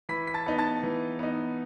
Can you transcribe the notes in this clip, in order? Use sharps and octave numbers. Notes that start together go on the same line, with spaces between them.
E3 B5 B6
B6
A5 A6
B3 D#4
A5 A6
E3
B3 D#4